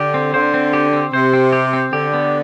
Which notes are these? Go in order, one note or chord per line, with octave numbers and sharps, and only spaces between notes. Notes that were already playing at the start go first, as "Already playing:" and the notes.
Already playing: D3 G4
C4
D3 C5
C4
G4
C4
C3 C5
C4
G4
C4
D3 G4
B3